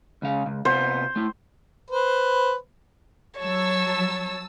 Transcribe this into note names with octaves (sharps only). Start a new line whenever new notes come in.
C#2 C#3 F5
C#2
C3 B3 F4 C5
A3 E4
B4 C5
F#3 C#5 A5 E6